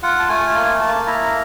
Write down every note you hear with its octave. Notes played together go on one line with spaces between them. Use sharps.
F4 F#5
A5
A3 G#5
A5
A#3 G#5
A#3 A5
E4 A#5